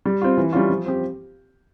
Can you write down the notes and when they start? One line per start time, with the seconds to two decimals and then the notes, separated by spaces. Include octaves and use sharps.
0.05 G3
0.22 C4 F4
0.37 E3
0.53 G3 C#4 F4
0.70 F3
0.86 C4 G4